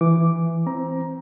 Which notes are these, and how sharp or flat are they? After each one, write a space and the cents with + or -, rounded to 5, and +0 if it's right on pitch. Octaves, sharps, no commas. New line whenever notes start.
E3 +10 D6 +0
C4 +0 A#5 +15